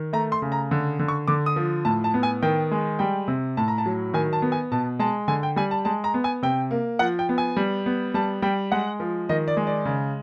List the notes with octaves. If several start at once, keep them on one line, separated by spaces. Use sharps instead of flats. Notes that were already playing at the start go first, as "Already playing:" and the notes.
Already playing: D#3
A3 A#5
C6
C#3
A#5
D3
D3
C#6
D3 D6
D#6
F3
A2 A5
A5
B3
G#5
D#3 G5
G#3
G3 G5
C3
A2 A5
A#5
A5
F#3
D#3 G#5
A5
B3
G#5
B2 A5
G#3 A5
D3 G#5
G5
G3 G#5
A5
G#3 A5
A#5
B3
G#5
C3 G5
A#3
F3 F#5
G5
B3
G#5
G3
B3
G3 A5
G3 G5
G#3 F#5
F3
D#3 D#5
D5
G#3
D5
C#3